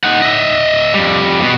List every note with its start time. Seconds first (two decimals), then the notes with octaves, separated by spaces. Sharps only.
0.04 D#4 F#5
0.22 D#5 E5
0.94 F2 G3
1.41 B2